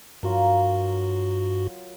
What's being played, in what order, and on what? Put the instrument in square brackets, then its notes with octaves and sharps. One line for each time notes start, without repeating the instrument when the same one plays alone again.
[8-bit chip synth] G2 F#4 [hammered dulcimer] F#3 F4 A#4